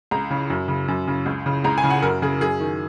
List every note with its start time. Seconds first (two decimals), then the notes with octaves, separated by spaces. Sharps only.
0.11 C#2 A#5
0.31 C#3
0.50 F#2
0.68 C#3
0.88 F#2
1.08 C#3
1.26 C#2
1.46 C#3
1.64 C#2 A#5
1.78 G#5
1.84 C#3
1.90 F#5
2.02 F#2 A#4
2.22 C#3 G#4
2.41 F#2 G#4
2.60 D#3